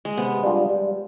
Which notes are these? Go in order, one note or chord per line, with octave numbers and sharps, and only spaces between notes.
G#3
C3 B3
G3 D4 F4 G#4
G3